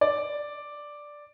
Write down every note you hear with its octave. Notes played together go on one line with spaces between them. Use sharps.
D5